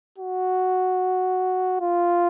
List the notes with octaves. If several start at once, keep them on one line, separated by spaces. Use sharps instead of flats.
F#4
F4